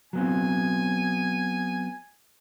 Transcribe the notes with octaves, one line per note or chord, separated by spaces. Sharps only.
F#3 B3 C4 G#5